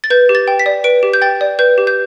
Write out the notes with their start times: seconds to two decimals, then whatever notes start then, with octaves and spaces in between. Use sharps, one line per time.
0.04 A6
0.10 B4 G6
0.29 G4
0.35 A6
0.48 G5
0.59 B6
0.66 D5
0.84 B4 D7
1.03 G4
1.13 G6
1.22 G5 A6
1.41 D5
1.59 B4 G6
1.78 G4
1.87 G6